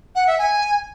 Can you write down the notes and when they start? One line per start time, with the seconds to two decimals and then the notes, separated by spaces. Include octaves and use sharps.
0.15 F#5
0.27 E5
0.38 G#5